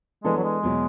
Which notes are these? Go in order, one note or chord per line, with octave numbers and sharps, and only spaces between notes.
E3 G#3 B3 D4 A4
F#3
G#3
E2 B2 F#3